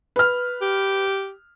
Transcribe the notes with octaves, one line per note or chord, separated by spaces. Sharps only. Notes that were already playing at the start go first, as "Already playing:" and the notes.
B4 F6
G4